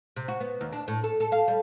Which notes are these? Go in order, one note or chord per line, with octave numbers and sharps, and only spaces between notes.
C3
F#4
B3
D#2
D4
A2
A4
A4
F5
G3